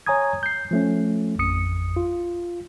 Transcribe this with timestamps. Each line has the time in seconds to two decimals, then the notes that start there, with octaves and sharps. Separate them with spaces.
0.06 C#5 G#5 A#5 D#6 G#6
0.43 G6 C7
0.71 F3 A3 C#4
1.39 A1 F2 D#6 C#7
1.96 F4